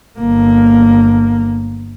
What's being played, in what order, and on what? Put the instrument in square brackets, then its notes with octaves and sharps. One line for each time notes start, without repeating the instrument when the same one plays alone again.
[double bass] G1 A#3